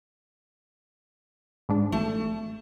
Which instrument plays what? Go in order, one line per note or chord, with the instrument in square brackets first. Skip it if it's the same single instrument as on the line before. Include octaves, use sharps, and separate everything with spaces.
[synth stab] G#2 D4
[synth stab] A1 [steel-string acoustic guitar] A3 A5